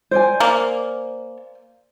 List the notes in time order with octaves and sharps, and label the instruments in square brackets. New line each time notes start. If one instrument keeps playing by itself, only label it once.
[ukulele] C5 D5 G#5
[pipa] A#3